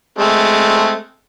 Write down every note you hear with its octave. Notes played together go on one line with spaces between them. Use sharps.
G#3 A3 C4